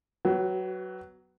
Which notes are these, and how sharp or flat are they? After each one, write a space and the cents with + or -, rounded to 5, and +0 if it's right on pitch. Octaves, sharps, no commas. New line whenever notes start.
F#3 +10 B3 +0 F#4 +45